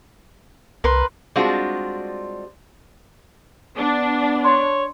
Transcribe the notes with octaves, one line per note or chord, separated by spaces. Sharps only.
C2 A#4 B4 C6
G3 G#3 C4 D4 F4 F#4
B3 D4
C#5 C6